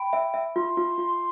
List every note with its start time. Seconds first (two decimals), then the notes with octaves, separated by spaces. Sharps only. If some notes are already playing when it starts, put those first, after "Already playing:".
Already playing: G5 B5
0.13 E5
0.34 E5
0.56 F4 C6
0.77 F4
0.98 F4